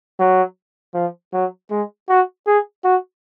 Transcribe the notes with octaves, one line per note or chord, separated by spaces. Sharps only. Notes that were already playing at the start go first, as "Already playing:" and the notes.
F#3
F3
F#3
G#3
F#4
G#4
F#4